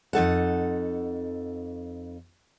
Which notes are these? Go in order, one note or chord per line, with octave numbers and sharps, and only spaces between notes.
F2 D#4 A4 F#5